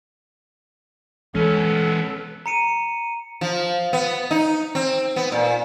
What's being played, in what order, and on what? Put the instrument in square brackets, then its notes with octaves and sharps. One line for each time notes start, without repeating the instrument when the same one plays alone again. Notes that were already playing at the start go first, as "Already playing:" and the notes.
[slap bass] E3 G#3 [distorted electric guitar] B3 C#4 [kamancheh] A4
[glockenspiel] A#5 C#7 D#7
[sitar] F3
B3
D#4
C4
B3
A#2